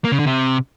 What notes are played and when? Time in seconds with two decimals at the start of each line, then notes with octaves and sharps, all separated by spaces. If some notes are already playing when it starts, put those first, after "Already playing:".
0.05 A#3
0.12 C#3
0.19 D3
0.27 C3